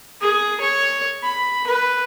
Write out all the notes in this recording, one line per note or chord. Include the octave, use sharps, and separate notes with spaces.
G#4
C#5
B5
B4